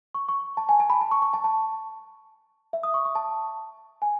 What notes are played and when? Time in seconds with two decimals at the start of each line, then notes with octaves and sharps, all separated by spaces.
0.15 C#6
0.29 C#6
0.57 A5
0.69 G#5
0.80 A5
0.90 B5
1.01 A5
1.11 C#6
1.22 C#6
1.34 A5
1.44 A5
2.73 E5
2.83 D#6
2.94 C#6
3.05 C#6
3.15 A5
4.02 G#5